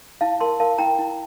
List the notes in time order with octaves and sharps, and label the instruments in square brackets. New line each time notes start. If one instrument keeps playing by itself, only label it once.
[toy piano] E4 F5 A5
A#4 A5 C6
A#4 F5 A5
E4 G5 A#5
E4